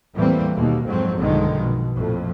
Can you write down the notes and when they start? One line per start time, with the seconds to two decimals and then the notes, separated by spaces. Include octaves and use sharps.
0.14 E2 A2 E3 G3 A#3 C4
0.55 D#2 B2 A#3
0.86 F2 G#2 F#3 C4
1.18 B1 G2 D3 D#3 F3 G#3
1.59 B2
1.93 A#1 F2 A2